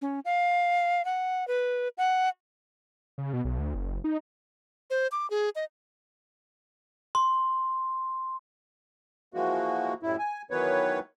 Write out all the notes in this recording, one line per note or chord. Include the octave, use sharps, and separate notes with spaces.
C#4
F5
F#5
B4
F#5
C#3
B2
B1
D2
F#1
D#4
C5
D6
G#4
D#5
C6
E3 F3 G#3 A#3 F#4
F#2 A2 G3 E4
G#5
D#3 E3 F#3 B3 B4 C#5